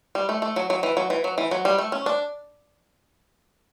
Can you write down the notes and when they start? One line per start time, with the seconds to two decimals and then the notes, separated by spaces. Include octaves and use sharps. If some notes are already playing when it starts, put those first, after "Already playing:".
0.15 G3
0.29 A3
0.42 A3
0.56 F#3
0.70 F#3
0.83 E3
0.97 F#3
1.10 E3
1.24 F#3
1.38 E3
1.51 F#3
1.65 G3
1.78 A3
1.92 C#4
2.06 D4